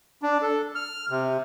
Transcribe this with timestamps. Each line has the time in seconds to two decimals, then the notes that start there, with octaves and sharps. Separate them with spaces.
0.22 D4
0.42 A4
0.75 F6
1.10 C3